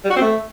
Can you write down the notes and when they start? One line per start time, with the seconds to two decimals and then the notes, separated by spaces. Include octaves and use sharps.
0.05 G3
0.10 F#4
0.16 C4
0.22 A3